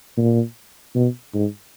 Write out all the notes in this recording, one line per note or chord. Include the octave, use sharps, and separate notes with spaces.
A#2
B2
G#2